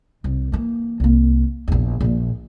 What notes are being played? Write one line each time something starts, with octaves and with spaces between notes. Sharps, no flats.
C2
E3 A#3
C2 A#3
A#1 E2
A#1 A#2